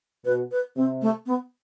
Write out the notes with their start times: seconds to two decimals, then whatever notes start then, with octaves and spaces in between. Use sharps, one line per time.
0.25 B2 B4
0.51 B4
0.76 C3 C4
1.01 A3
1.26 B3